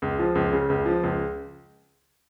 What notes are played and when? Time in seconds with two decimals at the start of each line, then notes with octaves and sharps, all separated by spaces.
0.02 C#2
0.19 F3
0.35 C#2
0.53 C#3
0.70 C#2
0.85 F3
1.03 C#2